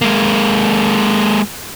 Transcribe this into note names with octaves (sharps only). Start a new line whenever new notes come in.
G#3 A#3